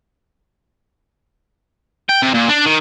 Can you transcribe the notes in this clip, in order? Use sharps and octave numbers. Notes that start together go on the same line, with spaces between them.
G5
C3
A#2
D4
D#3